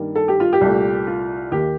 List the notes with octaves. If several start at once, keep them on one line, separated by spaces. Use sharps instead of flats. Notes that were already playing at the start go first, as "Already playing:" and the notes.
Already playing: G2 D#3 G3 A#3
A4
G4
F4
G4
C2 A#2 A3
F4
D#2 D#3 A#3 G4